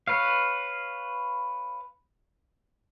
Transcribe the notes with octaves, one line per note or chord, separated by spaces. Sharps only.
B4 C#5 F5